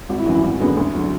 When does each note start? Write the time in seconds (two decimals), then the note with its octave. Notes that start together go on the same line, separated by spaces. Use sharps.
0.09 G#1 F#4
0.18 E4
0.26 F#2 E3 F#4
0.35 E4
0.43 G#1 F#4
0.60 F#2 D3 G#3 B3
0.77 D2
0.94 D3 F#3